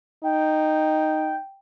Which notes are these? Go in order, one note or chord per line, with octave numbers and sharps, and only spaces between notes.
D#4 G5